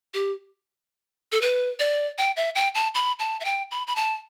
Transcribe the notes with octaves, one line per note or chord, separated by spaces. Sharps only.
G4
A4
B4
D5
G5
E5
G5
A5
B5
A5
E5
G5
B5
B5
A5